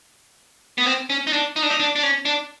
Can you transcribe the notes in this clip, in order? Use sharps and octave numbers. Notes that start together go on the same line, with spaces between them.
B3
C4
C#4
D#4
D4
D#4
D4
D#4
D4
D4
C#4
D4